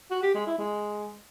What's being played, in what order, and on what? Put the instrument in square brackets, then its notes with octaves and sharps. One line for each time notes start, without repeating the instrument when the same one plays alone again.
[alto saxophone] F#4
G4
G#3
E4
G#3